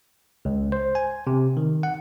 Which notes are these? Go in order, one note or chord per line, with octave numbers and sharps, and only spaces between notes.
C#2
C5
G#5
C3
D#3
F#5